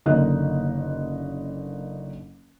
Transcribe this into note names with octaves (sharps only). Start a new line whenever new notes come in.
F#1 D3 A#3 D#4 D#5 F#6